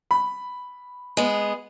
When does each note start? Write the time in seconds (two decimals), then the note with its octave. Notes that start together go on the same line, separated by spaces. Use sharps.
0.11 B5
1.17 G#3 B3